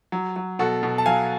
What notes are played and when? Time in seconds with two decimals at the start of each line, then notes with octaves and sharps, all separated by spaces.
0.12 F#3
0.36 F#3
0.59 B2 F#4 A4
0.83 B2
0.98 A5
1.06 F#3 F5 G#5